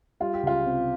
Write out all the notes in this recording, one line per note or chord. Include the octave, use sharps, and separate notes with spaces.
G3 F4
G4
C#2 F4
C3